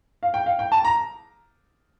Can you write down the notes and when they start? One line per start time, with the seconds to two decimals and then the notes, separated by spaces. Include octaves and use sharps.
0.23 F5
0.34 G5
0.46 F5
0.59 G5
0.72 A5
0.85 A#5